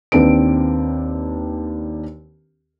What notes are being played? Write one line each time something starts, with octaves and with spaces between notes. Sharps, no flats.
D#2 C4 D4 B4 D7